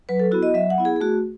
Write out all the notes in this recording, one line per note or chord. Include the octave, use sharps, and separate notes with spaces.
F#3 B4
A4
B3 E4 F#4
D#5
F#3 E5
F#5
B3 E4
G#4
G#4
A3 F#4